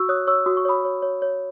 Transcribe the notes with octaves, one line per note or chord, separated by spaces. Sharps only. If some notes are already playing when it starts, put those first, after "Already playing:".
Already playing: F#4 C#6 E6
C#5 D#6 F#6
C#5 C#6 E6
F#4 D#6
C#6
C#5 B5 D#6
C#5
C#5
C#5